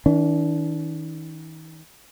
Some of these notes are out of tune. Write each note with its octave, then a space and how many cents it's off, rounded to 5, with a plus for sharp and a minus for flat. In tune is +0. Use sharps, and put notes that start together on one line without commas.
D#3 +40 D4 -30